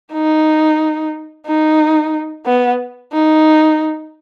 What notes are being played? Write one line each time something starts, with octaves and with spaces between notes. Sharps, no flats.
D#4
D#4
B3
D#4